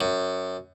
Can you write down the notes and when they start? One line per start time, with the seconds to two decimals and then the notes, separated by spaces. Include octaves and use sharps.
0.01 F#2